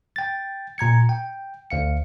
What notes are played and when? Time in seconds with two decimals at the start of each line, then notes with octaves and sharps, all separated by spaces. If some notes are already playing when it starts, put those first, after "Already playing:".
0.16 G5 A6
0.78 A#2 A#5 G#6 C#7
1.09 G5
1.71 D2 F5 C#7